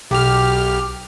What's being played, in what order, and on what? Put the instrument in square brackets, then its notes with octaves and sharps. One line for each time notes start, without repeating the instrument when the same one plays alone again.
[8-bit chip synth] B1 F6 [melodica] G4